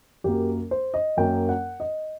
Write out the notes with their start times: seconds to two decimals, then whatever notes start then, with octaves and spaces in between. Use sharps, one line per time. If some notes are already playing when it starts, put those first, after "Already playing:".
0.24 F#2 F#3 A#3 G4
0.71 C5
0.94 D#5
1.17 F#2 F#3 A#3 G5
1.49 F#5
1.80 D#5